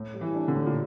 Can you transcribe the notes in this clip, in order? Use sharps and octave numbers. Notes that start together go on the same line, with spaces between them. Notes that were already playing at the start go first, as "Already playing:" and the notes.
Already playing: A2
G3
E3
D4
D3
A2
A#2